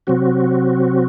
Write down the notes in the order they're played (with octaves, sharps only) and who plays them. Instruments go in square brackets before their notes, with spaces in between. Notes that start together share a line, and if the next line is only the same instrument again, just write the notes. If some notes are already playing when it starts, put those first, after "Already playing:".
[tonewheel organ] C3 F#3 C4 F#4